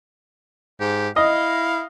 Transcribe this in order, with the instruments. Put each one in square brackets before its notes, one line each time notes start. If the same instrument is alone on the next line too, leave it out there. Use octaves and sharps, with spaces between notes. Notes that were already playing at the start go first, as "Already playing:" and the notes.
[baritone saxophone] G#2 [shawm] G4
[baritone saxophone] E4 [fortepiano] D#5 [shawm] F5